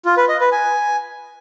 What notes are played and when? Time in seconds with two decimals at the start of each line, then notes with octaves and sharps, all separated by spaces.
0.05 F4
0.17 B4
0.29 D#5
0.40 B4
0.52 G#5